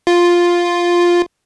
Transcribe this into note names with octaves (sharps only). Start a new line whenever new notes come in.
F4